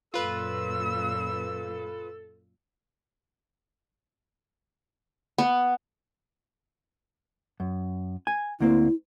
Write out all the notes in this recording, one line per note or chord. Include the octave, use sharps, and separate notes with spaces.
F#2 A#2 F4 A4 B4 E6
B3
F#2
G#5
D2 A#3 C4 E4